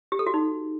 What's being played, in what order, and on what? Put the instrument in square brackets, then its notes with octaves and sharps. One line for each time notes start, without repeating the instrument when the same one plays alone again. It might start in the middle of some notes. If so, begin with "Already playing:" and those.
[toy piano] G4
A4
F#4
D#4